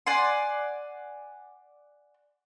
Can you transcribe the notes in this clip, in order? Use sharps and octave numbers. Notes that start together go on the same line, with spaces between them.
D5 F#5 G#5 C6